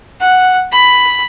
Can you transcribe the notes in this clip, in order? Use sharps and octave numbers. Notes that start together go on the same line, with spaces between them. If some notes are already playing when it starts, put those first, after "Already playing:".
F#5
B5